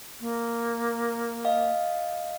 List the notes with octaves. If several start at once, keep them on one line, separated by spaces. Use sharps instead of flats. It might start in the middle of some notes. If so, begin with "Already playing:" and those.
A#3
D#5 F5